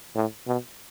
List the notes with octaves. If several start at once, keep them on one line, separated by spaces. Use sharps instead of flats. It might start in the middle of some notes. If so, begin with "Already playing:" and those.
A2
B2